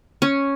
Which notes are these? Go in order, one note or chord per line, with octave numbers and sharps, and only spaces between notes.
C#4